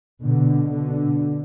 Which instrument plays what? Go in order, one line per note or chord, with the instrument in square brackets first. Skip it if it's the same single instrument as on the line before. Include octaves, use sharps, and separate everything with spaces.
[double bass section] B2 D3
B2 D3